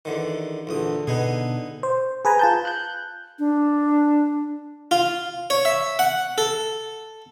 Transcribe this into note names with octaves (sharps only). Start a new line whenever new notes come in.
E2 D3 D#3
A#1 E2 D3 D#6
B2 B3 D#4 G#4
C5
G#4 B4 G#5 A#5
F4 A5 G6
F#6 G6
D4
F4
C#5
E5
F#5
A4